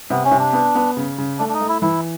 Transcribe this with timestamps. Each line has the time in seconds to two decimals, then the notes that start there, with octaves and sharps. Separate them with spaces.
0.10 C3 B3
0.24 C#4
0.31 C3
0.39 D4
0.53 B3
0.75 B3
0.97 C#3
1.18 C#3
1.39 A3 D4
1.49 D4
1.54 D#4
1.61 A3
1.68 E4
1.82 E3 E4